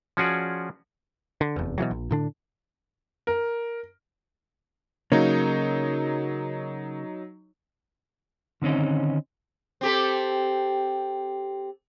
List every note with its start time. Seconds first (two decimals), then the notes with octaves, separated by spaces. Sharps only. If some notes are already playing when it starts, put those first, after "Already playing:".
0.17 F3 C#4 F#4 G#4 D5
1.41 D3
1.56 F1 E2
1.78 B2 D3 E3 F#3
1.91 A#1
2.11 A2 D3 D4
3.27 A#4
5.12 C#3 F#3 A#3 D#4 C#5
8.62 D3 D#3 C4 C#4 D#4
9.81 C4 G4 A4